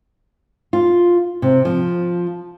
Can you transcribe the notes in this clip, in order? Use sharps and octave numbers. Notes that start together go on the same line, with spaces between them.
F4
C3
F3